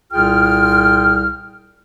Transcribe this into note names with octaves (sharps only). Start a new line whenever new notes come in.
C2 A#2 F4 G#4 G5 F6